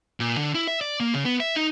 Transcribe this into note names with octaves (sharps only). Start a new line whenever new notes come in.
A#2
D3
E4
E5
D5
A#3
C#3
B3
E5
D#4